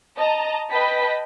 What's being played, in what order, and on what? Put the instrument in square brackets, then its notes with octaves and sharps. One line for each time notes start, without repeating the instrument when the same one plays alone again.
[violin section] D#5 A5 A#5
B4 D#5 G5 A5 B5 B6